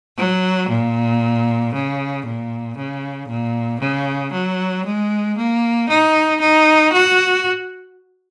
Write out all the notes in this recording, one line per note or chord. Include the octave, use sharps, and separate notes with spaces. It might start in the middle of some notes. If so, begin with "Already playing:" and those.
F#3
A#2
C#3
A#2
C#3
A#2
C#3
F#3
G#3
A#3
D#4
D#4
F#4